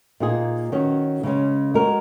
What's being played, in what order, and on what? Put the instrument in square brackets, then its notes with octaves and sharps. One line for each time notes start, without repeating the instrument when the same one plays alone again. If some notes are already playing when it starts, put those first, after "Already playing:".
[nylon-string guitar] A#2 A#3 D#4 G#4
D#3 F#3 C#4
C#3 G#3 C#4
G#3 F#4 A#4